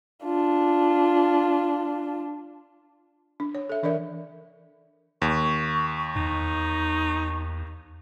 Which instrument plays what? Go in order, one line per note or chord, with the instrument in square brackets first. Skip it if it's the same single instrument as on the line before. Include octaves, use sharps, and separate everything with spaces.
[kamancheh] D4 F4
[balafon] D4
C#5
A4 E5
E3 D4 A#4 D5 E5
[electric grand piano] D#2 [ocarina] C#6
[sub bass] E2 [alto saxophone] D#4